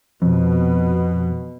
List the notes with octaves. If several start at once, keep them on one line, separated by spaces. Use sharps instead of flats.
F2 B2